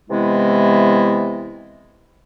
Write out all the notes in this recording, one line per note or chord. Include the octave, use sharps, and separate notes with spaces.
C3 E3 G#3 B3 E4